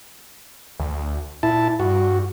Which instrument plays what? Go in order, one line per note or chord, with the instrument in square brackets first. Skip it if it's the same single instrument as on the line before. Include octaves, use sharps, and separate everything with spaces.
[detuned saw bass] D2
[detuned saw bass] A#2 [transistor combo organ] E4 A5
[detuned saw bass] G2 [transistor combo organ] F#4